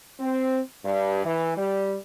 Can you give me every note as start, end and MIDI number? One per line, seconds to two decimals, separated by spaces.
0.19 0.60 60
0.84 1.24 43
1.24 1.55 52
1.56 1.95 55